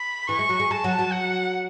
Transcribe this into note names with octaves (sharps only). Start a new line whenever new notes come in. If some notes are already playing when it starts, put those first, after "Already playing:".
Already playing: B5
E3 C#6
G#3
F#3
G#3
G#3 A5
F#3
F#3
F#5